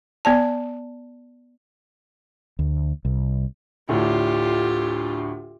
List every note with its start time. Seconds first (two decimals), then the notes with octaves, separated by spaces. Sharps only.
0.25 B3 D5 A5
2.59 D2
3.05 C2
3.89 D2 A2 D4 F4 G4